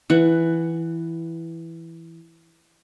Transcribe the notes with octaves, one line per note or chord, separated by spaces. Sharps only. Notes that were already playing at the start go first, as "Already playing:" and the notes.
E3 F#5